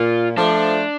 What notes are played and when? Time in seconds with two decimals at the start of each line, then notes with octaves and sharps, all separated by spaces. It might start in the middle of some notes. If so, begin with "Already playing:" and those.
Already playing: A#2 F4
0.37 F3 A3 D4